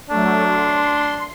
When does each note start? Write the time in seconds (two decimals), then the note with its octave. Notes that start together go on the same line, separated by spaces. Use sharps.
0.10 F#3 A3 D4
0.49 C6